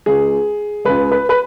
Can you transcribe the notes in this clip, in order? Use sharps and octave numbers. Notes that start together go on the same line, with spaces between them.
C#2 C#3 G#3 G#4
C#2 C#3 G#3 B4
B4
B4